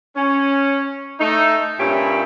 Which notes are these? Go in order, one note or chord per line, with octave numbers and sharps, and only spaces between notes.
C#4
A3 D#4
G2 A#2 C#4 G4 E5 B5